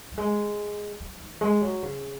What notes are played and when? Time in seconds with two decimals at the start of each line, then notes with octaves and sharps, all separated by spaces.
0.12 F#3
0.18 G#3
1.00 F#3
1.20 D#3
1.41 G#3
1.62 F#3
1.83 C#3